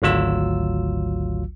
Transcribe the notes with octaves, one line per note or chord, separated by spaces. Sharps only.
G#1 D2 F#3 F4 E6